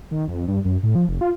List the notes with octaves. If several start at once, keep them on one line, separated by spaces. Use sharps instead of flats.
D#3
F2
G2
F#2
A2
F3
F1
F4